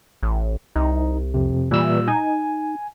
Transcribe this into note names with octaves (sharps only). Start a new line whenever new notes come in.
A1
C2 D#4
F2 C3
A#2 E3 G3 E6
D#4 G#5